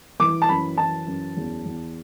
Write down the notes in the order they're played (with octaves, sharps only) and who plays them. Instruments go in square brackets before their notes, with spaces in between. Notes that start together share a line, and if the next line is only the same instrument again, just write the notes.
[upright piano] E3 D6
A5
F#2 B5
E3 A5
F#2
E2
E2